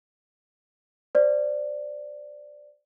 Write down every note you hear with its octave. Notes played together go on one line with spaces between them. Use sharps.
C5 D5